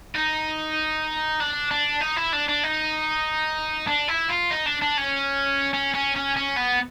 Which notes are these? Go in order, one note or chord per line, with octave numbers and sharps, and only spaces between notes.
D#4
D4
D4
D#4
E4
D4
D4
D#4
D4
E4
F4
D#4
D4
D4
C#4
C#4
C#4
C#4
C#4
B3